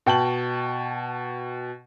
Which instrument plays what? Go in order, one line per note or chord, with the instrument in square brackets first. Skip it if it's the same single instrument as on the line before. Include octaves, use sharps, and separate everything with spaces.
[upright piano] B2 G5 A5 F#7